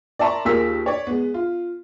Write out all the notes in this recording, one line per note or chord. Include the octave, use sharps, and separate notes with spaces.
D5 E5 A5 A#5 C6 C#6
D#2 F4 G#4 A#4 E6 B6
C#5 D5
G#3 B3
F4